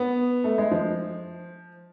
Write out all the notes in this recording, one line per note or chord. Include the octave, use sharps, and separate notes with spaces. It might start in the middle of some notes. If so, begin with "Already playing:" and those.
Already playing: B3
A3
G#3
F3